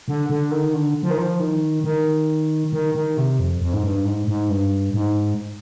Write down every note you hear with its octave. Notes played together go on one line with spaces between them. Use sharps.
D3
D3
D#3
D3
F3
D#3
F3
D#3
D#3
D#3
D#3
C3
F2
F2
G#2
G2
G#2
G#2
G2
G#2